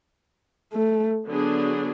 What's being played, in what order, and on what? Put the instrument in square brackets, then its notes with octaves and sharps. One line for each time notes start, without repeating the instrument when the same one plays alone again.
[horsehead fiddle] A3
[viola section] D3 F#3 B3 D4 G#4